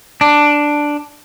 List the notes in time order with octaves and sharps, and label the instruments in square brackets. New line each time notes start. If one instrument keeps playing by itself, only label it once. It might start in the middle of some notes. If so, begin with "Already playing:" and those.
[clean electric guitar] D4